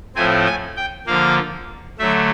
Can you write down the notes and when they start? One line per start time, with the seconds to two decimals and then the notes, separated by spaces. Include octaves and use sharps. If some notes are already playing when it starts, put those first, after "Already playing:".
0.15 A2 F3 A3 C4 G#5
0.46 G#5
0.76 G5
1.06 D3 F3 A#3 F5
1.98 D3 F#3 A3 E5